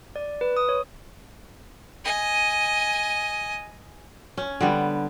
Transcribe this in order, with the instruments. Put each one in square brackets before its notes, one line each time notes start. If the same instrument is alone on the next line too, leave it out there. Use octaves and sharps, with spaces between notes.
[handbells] D5
B4
D#6
C#5
[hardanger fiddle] D#5 G#5
[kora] C#4
D3 G3 B3